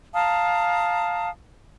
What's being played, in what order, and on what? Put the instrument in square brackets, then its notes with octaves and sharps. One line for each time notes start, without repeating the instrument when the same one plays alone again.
[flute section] F5 A5 A#5 D#6